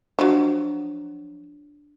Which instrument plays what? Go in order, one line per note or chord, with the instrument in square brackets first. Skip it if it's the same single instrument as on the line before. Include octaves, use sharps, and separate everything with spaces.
[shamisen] F3 F#3 [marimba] D4